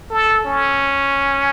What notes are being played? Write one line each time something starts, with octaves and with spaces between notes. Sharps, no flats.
A4
C#4